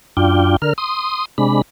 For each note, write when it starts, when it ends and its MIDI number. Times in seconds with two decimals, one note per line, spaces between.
0.17 0.57 42
0.17 0.57 62
0.17 0.57 65
0.17 0.57 79
0.62 0.73 50
0.62 0.73 70
0.62 0.73 89
0.78 1.25 84
0.78 1.25 87
1.38 1.62 48
1.38 1.62 56
1.38 1.62 62
1.38 1.62 83